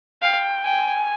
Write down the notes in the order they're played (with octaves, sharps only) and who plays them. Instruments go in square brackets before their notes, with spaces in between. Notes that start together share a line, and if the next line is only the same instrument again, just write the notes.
[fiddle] F5 [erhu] G5
[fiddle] G5 [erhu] G#5